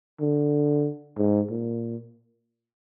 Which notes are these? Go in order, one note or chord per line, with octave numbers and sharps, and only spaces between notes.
D3
G#2
A#2